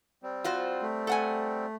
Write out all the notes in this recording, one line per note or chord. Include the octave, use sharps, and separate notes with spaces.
G3 C4
F4 F#4 C5
A3
A4 F#5 G#5